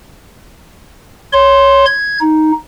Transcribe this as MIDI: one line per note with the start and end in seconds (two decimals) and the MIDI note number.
1.33 1.85 73
1.33 1.85 84
1.86 2.18 92
2.21 2.52 63